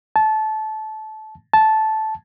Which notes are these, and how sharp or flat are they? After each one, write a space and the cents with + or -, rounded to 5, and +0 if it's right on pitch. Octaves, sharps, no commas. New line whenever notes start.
A5 -20
A5 -10